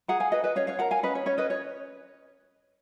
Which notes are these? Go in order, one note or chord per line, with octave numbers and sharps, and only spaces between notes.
G#4 F#5 A#5
F5 G#5
B4 D#5 F#5
B4 D#5
C#4 C#5 F5
C#5 F5
A#4 F#5 A#5
F5 G#5
C#4 B4 D#5
C#5
C#4 C#5
B4 D#5
C#5